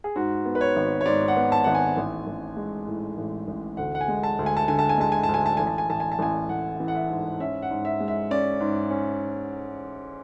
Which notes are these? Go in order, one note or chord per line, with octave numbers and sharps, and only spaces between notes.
G#4
G#2 F#4
B3
B4
C#5
G#1
C#5
G#2 D5
F#5
B3
A5
G#1 F#5
G#5
A1
A1
G#3
A2
A1
A1
D2 F#5
F#5
G#5
G#3
A5
D2
G#5
A5
D3 G#5
A5
G#5
G#3 A5
G#5
A5
D2 G#5
A5
A1 G#5
A5
G#5
A1 A5
G#5
A5
A1 G#5
A1 F#5
E3
F#5
E5
G#2
C#4 E5
F#5
G#2
E5
G#3
E5
C#4 D5
G#2
C#4